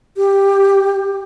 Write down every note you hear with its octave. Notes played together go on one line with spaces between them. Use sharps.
G4